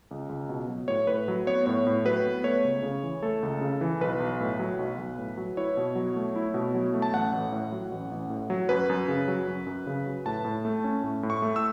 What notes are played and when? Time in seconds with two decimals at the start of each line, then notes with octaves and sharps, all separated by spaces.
0.11 C#2
0.29 C#2
0.49 B2
0.68 F#3
0.88 A2 C#5
1.07 A2 B4
1.28 F#3
1.47 B3 C#5
1.66 A2 C#5
1.87 A2
2.05 F#3 B4
2.26 B3
2.44 A3 C#5
2.64 C#2
2.83 C#3
3.03 E3
3.23 A3 A4
3.43 C#2
3.61 C#3
3.81 E3
4.01 B1 B4
4.20 B1
4.40 A2
4.59 F#3
4.79 B1
4.98 B1
5.19 A2
5.37 F#3
5.57 E4 C#5
5.77 B2
5.95 F#3
6.16 A3
6.36 E4
6.54 B2
6.74 F#3
6.94 A3
7.02 A5
7.13 A1 F#5
7.33 A1
7.52 A2
7.72 F#3
7.92 A1
8.11 A1
8.30 A2
8.50 F#3
8.69 F#2 B4
8.90 F#2
9.08 C#3
9.28 F#3
9.48 F#2
9.67 F#2
9.87 C#3
10.06 F#3
10.26 A2 A5
10.45 A2
10.65 A3
10.84 C#4
11.03 A2
11.23 A2
11.30 C#6
11.42 A3
11.56 E6